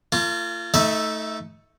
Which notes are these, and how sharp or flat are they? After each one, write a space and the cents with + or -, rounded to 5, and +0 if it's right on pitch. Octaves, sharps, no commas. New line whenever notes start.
A3 +40 F4 -30
A3 +0 D#4 +30 E5 +0